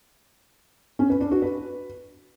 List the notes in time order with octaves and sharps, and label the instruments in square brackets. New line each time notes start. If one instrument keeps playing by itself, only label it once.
[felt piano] C#4
B4
D4
F#4
B4